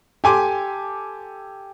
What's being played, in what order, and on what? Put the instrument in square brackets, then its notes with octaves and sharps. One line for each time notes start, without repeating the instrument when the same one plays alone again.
[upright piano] G4 A4 G#5 C6 D6